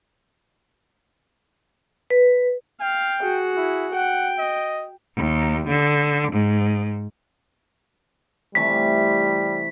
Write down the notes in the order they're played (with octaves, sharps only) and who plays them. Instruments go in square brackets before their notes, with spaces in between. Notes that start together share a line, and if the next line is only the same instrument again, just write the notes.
[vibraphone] B4
[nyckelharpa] F5 [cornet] G5
[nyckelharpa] F#4 G#4
[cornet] E4
[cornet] F#5 [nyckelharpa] G5
[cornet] D#5
[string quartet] D#2
D3
G#2
[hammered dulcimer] C3 E3 A3 [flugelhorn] G3 [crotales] B6